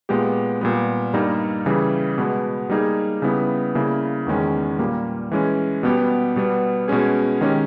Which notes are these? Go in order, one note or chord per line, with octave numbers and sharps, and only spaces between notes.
A#2 G#3 B3 G4
A#2 G3 B3
G2 G3 A#3 D#4
C#3 E3 G3
B2 G#3 B3
G3 A#3 D#4 G#4
C#3 G3 B3 E4
C#3 G3 A#3 E4
E2 D#3 G#3 C#4
A#2 G3 A#3
E3 G#3 C#4
B2 G3 B3 G4
B2 G3 B3
B2 G#3 C#4 G#4
D#3 G#3 C#4 G4